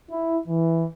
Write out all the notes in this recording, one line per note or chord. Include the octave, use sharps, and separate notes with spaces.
E4
E3